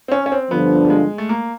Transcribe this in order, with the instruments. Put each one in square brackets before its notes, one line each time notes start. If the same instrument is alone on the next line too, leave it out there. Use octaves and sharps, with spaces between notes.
[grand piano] C4
C#4
C#4
C4
[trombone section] G2 D3 F3 [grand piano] B3
[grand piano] G3
G#3
A3
A#3